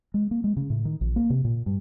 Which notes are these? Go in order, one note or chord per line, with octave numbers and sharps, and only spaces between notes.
G#3
A#3
G#3
C#3
A2
D#3
A#1
A#3
C3
A#2
G2